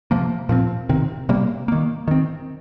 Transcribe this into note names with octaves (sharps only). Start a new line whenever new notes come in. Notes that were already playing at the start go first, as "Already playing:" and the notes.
C3 F3 A#3
A#2 F3 C4
C3 D#3 C4
C3 G3 A#3
D#3 A#3
D#3 C4